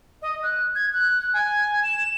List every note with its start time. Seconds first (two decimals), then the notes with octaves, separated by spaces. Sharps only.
0.22 D#5
0.43 F#6
0.75 G#6
0.94 F#6
1.34 G#5
1.83 E7